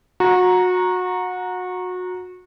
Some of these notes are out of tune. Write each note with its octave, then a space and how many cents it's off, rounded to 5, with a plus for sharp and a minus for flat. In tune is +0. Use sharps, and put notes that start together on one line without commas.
F#4 -25 A#5 +0